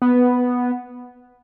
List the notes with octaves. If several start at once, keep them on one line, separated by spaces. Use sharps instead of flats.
B3